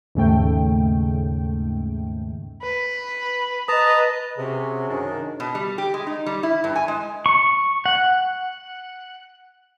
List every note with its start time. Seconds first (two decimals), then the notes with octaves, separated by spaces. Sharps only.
0.15 D#2 G#2 C#3 A3 G5
2.62 B4
3.68 B4 D#5 A5 A#5 D#6
4.38 C3 C#4 F#4 G#4
4.89 F#2 D#3 D4
5.40 B2
5.55 G3
5.78 G4
5.94 G#3
6.07 D#4
6.26 G3
6.43 E4
6.64 G2
6.76 G#5
6.88 G#3
7.26 C#6
7.86 F#5